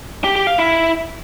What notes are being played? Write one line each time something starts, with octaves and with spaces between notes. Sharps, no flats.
G4
G4
F5
E4